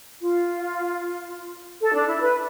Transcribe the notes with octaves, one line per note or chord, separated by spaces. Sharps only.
F4
A4
D4
E4
B4